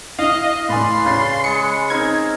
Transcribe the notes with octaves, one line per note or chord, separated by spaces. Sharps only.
E4 D#5 F5
A2 B4 D5 G#5 C6
C#3 B5 A6 C7
G#3 C#7
C4 D#4 A#4 G#6